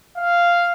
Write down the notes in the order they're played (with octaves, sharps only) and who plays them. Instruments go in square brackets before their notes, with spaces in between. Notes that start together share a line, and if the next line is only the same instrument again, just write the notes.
[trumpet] F5